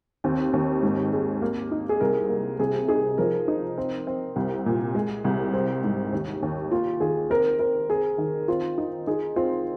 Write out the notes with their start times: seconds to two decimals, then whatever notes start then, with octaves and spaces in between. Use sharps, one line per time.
0.24 D#2 C4
0.53 D#2
0.83 G#2
1.12 G#3
1.42 A#3
1.72 D#4
1.89 G#4
2.01 C2 A#4
2.30 A#3
2.59 C3 G#4
2.88 D#4 G#4
3.18 F3 A#4
3.48 D#4
3.78 C4
4.07 C4
4.36 C2
4.66 A#2
4.95 G#3 G#4
5.25 C2
5.54 C4
5.84 G#2
6.13 D#2
6.42 D#2
6.71 A#3 F4
7.00 D#3 G#4
7.30 C4 A#4
7.59 C4 A#4
7.90 C4 G#4
8.18 D#3
8.48 C4 F4
8.78 D#4
9.07 D#4 G#4
9.36 C4 F4